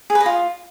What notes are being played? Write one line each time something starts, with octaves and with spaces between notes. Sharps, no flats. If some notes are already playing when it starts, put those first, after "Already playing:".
G#4
B4
D#5
F4